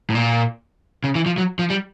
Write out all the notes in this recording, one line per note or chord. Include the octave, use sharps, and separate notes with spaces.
A2
A#2
C#3
E3
F3
F#3
F3
G3